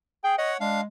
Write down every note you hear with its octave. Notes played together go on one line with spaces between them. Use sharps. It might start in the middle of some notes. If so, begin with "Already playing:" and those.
G#4 G5
C#5 D#5 F#5
G#3 D4 F5